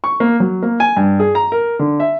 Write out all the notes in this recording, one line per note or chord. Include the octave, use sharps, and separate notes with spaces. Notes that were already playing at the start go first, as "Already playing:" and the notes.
C#6
A#3
F#3
A#3
G#5
G2
G#4
A#5
A#4
D3
E5